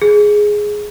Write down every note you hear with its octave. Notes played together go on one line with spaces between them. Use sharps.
G#4